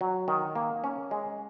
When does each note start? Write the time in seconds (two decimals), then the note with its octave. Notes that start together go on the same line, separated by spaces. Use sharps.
0.01 F#3
0.28 D#3
0.56 A#3
0.84 C#4
1.11 G#3